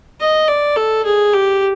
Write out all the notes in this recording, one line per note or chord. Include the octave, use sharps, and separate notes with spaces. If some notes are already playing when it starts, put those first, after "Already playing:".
D#5
D5
A4
G#4
G4